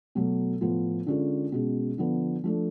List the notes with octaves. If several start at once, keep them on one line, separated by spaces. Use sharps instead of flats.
B2 F#3 A3
A2 F3 B3 F4
D3 G#3 C#4 F4
B2 G#3 C#4
D3 F3 B3
F3 A3 D4